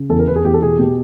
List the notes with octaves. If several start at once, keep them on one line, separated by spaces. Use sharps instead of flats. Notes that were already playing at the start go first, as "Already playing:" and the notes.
Already playing: C#3
E2 A4
A#4
E2 B4
G#4
E2 G4
A4
B2 G#4
B2 G4